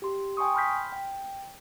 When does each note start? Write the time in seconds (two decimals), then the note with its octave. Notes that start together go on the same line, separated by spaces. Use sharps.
0.02 G4 C6
0.37 G5 G#5 C6 C#6 D#6
0.55 B5 C6 F6 G6 B6
0.92 G5